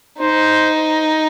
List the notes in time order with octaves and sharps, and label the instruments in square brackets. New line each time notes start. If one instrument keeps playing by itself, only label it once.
[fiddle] D#4 [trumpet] C5